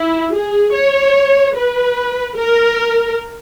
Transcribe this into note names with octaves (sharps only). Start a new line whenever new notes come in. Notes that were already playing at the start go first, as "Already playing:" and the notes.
Already playing: E4
G#4
C#5
B4
A#4